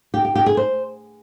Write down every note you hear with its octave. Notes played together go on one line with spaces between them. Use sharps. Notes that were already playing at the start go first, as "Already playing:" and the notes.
G4
G4
G4
G#4
C5